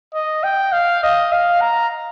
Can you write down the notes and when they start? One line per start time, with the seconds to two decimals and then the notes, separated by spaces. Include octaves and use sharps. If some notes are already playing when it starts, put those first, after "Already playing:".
0.14 D#5
0.44 G5
0.72 F5
1.03 D#5
1.32 F5
1.61 A#5